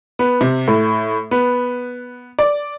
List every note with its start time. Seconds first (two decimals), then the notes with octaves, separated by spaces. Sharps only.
0.19 B3
0.41 C3
0.68 A2
1.31 B3
2.39 D5